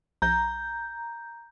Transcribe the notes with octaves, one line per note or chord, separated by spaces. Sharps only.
A#1 A#5 G6